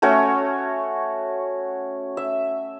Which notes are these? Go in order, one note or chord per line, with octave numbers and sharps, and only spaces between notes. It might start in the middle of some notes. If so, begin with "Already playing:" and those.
A3 C#4 F#4 C#5
E5